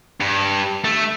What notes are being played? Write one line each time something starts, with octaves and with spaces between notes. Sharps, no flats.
G2
A3